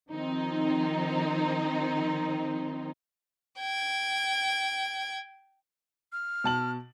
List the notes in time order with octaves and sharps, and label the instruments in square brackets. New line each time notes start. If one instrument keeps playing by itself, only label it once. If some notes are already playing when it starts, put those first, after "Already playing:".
[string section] D#3 F3 C4 D#4
[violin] G5 G#6
[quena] F6
[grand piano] B2 A5 F#7